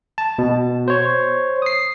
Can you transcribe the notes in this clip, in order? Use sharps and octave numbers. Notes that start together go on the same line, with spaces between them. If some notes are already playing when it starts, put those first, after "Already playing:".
A5
B2
C5 C#5
D#6 C7